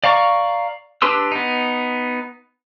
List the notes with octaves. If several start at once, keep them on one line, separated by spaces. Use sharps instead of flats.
D5 F5 A#5 C#6
D4 G4 B4 C6 E6
B3 D#4